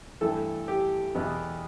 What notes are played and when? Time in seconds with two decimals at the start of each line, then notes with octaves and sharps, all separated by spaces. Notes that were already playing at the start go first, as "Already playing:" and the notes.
0.21 G2 E3 A3 A4
0.68 G4
1.15 E2 B2 B3